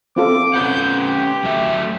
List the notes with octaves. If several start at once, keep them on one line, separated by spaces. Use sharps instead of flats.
C4 F4 A4 D6
C#4 B4 F#5 G6
G4
F#3 A3 E5